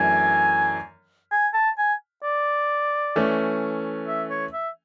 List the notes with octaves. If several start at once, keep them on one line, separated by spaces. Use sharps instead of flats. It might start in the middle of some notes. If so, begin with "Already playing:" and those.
Already playing: F#2 E3 A3 D4 G#5
G#5
A5
G#5
D5
E3 A3 C#4
E5
C#5
E5